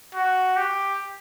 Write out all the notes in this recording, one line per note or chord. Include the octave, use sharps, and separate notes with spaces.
F#4
G4